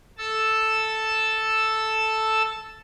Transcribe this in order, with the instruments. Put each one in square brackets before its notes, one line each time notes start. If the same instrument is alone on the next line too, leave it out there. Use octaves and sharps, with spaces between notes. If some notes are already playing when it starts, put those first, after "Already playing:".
[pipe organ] A4 A5 E6